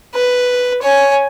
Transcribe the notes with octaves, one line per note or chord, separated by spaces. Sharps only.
B4
C#5 G#5